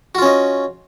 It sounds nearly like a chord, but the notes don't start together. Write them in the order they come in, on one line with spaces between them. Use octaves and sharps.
F#4 F4 C#4 D#5